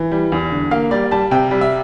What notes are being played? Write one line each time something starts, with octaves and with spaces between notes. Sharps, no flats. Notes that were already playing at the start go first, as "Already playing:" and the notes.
Already playing: E3
G3
E2
D3
A#3 F5
G3 D5
G3 A5
C3 G5
G3
E5